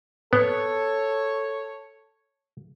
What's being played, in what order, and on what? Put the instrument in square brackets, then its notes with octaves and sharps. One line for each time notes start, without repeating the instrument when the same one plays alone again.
[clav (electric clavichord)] B3 [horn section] A4 C#5